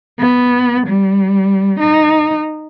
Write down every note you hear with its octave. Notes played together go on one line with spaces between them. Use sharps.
B3
G3
D#4